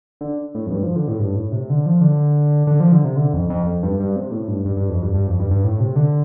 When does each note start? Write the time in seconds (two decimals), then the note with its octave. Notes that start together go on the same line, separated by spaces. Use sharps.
0.21 D3
0.55 A2
0.67 F2
0.71 G2
0.83 F3
0.96 D3
1.08 A2
1.19 G2
1.36 A2
1.52 C3
1.70 D3
1.86 F3
2.01 D3
2.67 D3
2.80 F3
2.92 D3
3.04 C3
3.17 D3
3.33 F2
3.50 F2
3.66 F2
3.83 G2
4.00 G2
4.16 C3
4.31 A2
4.48 G2
4.65 G2
4.77 G2
4.89 F2
5.02 G2
5.14 G2
5.27 F2
5.39 G2
5.51 G2
5.64 A2
5.80 C3
5.96 D3